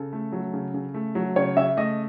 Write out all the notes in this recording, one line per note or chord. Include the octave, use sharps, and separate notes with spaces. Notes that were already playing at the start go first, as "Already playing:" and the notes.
Already playing: C#3 A4
A3
F#3
C#3
C#3
A3
F#3
C#3 C#5
C#3 E5
A3 D#5